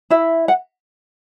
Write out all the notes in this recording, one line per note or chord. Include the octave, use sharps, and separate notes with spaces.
E4 E5
F#5